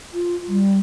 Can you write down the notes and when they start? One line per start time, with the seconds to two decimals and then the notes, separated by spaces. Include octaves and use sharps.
0.13 F4
0.47 G3